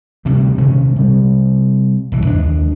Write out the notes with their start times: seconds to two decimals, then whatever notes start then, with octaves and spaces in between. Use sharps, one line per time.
0.25 D2 C3 G3
0.58 C3 D#3 G#3 C#4
0.96 C3 G3
2.12 B1 E3
2.26 D#2 G#3 D4